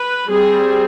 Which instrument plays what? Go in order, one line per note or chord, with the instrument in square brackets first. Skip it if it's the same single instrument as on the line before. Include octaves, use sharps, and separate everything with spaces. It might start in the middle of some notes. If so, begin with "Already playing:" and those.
Already playing: [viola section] B4
G3 C4 G#4